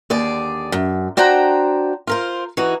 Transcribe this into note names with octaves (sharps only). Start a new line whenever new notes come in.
D#2 D3 G#4 D5
F#2
D4 F#4 C5 G5 A#5
F4 A#4 C5
E3 D#4 F#4